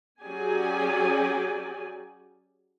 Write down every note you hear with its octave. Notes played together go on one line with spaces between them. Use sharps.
F#3 C#4 G4 G#4 D5 G#5